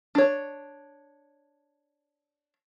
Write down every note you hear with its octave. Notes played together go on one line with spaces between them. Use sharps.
D4 C#5